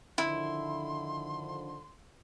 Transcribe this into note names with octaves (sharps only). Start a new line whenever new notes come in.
D3 D#3 F3 E4 C6